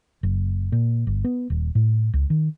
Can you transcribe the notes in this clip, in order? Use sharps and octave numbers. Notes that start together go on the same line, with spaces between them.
F#1
A#2
G1
B3
D#1
A2
C#2
D#3